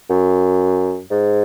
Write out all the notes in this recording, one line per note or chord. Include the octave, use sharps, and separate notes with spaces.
F#2
G#2